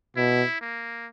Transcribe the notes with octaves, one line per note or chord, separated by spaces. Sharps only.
B2 E4
A#3